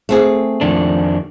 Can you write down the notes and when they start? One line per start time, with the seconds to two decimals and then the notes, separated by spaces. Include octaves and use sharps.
0.09 A3 C4 G#4
0.61 F2 D#3 D4